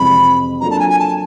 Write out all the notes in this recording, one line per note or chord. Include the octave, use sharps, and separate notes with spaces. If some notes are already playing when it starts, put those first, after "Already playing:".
Already playing: F2 C3 E3 G#3 C4 B5
F#3 A#3 D4 F4 A4 A#5
A5
G#5
G#5
A5